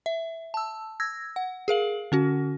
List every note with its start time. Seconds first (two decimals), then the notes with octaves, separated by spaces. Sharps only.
0.06 E5
0.54 A5 E6
1.00 E6 G#6 A#6
1.36 F#5
1.68 G#4 A#4 F5 F#7
2.12 D3 C#4 F#4